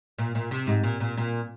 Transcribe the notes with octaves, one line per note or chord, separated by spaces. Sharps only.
A#2
A#2
C3
G#2
A#2
A#2
A#2